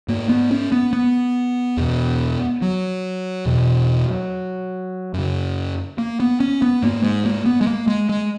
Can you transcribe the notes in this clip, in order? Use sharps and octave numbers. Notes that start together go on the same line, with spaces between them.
G#2 A#3
B3
C#4
B3
B3
E2 B2
F#3
E2 B2
F#2 C#3
A#3
B3
C#4
B3
G#2 A#3
G#3
A#3
B3
G#3
A#3
G#3
G#3